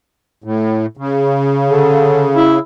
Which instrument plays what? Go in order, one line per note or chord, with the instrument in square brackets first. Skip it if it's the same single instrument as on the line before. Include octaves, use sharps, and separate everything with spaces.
[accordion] A2
C#3
[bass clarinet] D3
E4